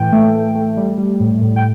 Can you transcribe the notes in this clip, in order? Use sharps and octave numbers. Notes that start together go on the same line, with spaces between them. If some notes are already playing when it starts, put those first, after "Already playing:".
Already playing: A2 E3 G5
A3
A3
A3
G3
G3
A2
A2
G5